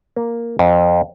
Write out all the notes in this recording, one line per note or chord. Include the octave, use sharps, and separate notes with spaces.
A#3
F2